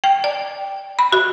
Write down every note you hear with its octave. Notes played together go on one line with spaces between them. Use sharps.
G5
D5
B5
F#4